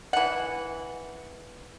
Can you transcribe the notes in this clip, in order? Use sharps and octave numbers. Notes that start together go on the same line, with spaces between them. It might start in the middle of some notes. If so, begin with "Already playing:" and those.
E3 F#5